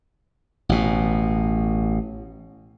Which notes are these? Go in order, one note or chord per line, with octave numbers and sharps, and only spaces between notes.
A1 B2